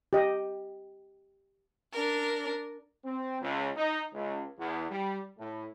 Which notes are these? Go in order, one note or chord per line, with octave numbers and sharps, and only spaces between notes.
G4 D#5
D4 A#4
C4
C#2
D#4
C#2
E2
G3
A2